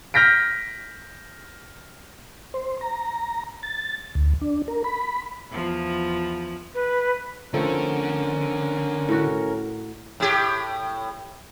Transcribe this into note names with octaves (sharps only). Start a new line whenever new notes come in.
F6 G6 A#6 B6 D7
C5
A#5
A6
D2
D4
A#4
B5
E2 F3
B4
D3 F3 A3 C4 C#4 A#4
A2 F#4
A2 G4